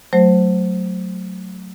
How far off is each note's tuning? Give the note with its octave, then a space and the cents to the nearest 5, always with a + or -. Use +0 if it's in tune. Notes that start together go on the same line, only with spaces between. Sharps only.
F#3 +0 A3 +0 C5 +0